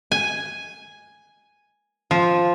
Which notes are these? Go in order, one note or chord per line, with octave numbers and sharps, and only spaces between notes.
G#5
F3